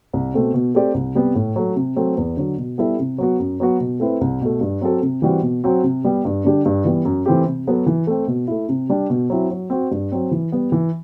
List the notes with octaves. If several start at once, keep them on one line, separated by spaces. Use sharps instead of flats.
C2
B2 A3 C4
B2
A3 C4 G4 D5
C2
C3 G3 B3
A2
F#3 A3
C3
F#3 A3 C4
E2
D3 F#3
B2
G3 B3 E4 A4
C3
F#3 B3 F#4
F#2
F#3 B3 F#4
B2
A3 C4 E4 B4
C2
B2 A3
G2
F#3 C4 F#4 A4
C3
E3 G3 C4 F#4
B2
F#3 C4 F#4
C3
G3 B3
G2
D3 G3 D4 G4
G2
E3 G3 B3
F#2
E3 A3 C4 G4
C3
F#3 B3 F#4 A4
E3
A3 C4
B2
A3 E4
C3
G3 D4
B2
F#3 C4 E4
F#3
C4 F#4
G2
F#3 C4
E3
G3 B3
E3